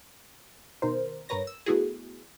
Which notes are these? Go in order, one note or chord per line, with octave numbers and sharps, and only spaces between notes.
B2 D#3 A#4 C5
G2 A#4 B4 C#5 A#6
E6
A3 B3 E4 F#4 G#4